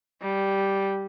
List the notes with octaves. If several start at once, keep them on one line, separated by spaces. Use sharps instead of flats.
G3